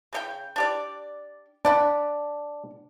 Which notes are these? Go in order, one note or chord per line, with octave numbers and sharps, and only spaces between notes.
C#3 D#4 G5
D4 G4 D5
D4 D5 F#5 B5